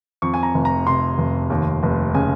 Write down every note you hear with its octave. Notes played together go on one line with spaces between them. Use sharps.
F2 C#6
G#5
A#5
F1
A#5
C3 C6
F1
D#2
F1
C#3 G#5